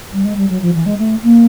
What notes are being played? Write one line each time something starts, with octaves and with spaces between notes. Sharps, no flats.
G3
G#3
G3
F#3
F3
E3
G#3
A3
A#3